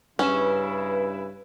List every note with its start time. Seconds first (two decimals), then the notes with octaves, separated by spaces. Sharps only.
0.19 G2 C#3 C#4 E4 B4 E7